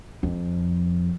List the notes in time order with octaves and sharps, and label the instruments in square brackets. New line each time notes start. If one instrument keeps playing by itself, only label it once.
[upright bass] F2